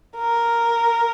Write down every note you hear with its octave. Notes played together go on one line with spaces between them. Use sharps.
A#4